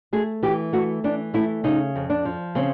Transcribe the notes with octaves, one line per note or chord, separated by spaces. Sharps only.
A3 G#4
E3 G4
A3 F#4
E3 D4
A3 E4
C#3 D#4
F2
D4
F3
C#3 C4